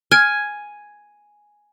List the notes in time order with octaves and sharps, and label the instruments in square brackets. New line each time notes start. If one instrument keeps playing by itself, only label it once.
[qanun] G#5 [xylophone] F6 G#6 D7